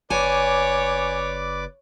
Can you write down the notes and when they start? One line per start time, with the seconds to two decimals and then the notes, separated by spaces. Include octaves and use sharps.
0.10 F#1 B4 C#5 D5 G#5 D6